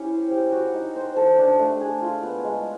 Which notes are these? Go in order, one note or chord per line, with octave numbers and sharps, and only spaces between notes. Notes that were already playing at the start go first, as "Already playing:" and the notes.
Already playing: C#4 E4 G4
C5
G4
F#4
D#4
C5
A4
D4
A3
G#4
F4
B3
G#3